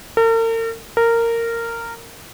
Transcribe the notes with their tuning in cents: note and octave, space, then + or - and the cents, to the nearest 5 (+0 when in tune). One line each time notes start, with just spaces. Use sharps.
A#4 -45
A#4 -15